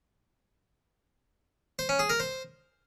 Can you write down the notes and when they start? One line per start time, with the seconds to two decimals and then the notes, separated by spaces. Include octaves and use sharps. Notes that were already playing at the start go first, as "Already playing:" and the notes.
1.79 C5
1.89 C#4
1.99 G#4
2.10 A#4
2.20 C5